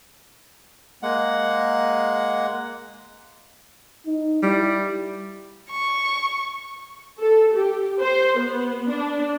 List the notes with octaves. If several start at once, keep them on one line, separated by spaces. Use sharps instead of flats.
G#3 A#3 F#5
D#4
G3 E4
C#6
A4
G4
C5
B3
D4